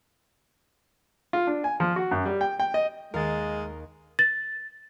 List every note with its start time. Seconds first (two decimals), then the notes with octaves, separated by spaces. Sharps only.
1.33 F4
1.47 D4
1.64 G#5
1.80 F3
1.96 F#4
2.11 F#2
2.26 G3
2.41 G5
2.60 G5
2.74 D#5
3.14 D#2 G#3 A#4 F5 A6
4.19 A6